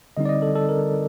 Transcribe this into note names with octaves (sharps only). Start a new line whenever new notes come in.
D3 G3 C4 D#4 D#5
D5
D#5
A4
A4
A#4